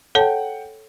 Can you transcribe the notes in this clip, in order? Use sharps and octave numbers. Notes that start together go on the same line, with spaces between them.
A4 C#5 F#5 G5 A5